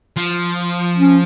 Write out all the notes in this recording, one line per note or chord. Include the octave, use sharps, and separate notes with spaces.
F3
C#4